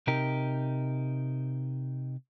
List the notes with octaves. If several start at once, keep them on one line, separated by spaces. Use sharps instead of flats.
C3 D#4 G4 A#4